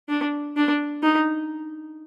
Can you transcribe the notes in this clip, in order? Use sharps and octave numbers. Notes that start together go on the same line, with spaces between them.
D4
D4
D#4